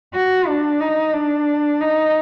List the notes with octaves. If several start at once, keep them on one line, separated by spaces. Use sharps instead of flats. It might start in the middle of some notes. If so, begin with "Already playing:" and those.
F#4
D4
D#4
D4
D#4